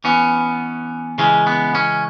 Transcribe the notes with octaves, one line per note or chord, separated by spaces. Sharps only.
E3 B3 C#4
C#3 E3 G#3 C#4
B3
C#4